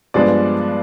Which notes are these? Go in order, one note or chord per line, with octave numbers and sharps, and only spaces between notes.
G2 F3 G#3 B3 D4 D5